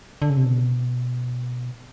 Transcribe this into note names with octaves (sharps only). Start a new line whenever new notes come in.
D3
C#3
C3
B2